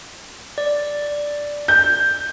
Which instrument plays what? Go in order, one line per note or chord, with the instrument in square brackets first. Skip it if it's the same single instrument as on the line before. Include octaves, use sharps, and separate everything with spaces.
[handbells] D5
[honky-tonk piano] G6